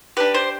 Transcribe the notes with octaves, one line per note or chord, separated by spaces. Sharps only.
D4 G4 B4
C5